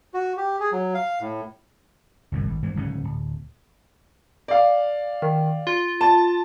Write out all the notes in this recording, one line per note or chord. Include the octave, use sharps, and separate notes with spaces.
F#4
G4
G#4
F#3
F5
A2
G1 C2 F#2
G#1
G#2 E3 F3
D1 C#2 G#2 C#4
D1
D5 F5
D#3
F4
A5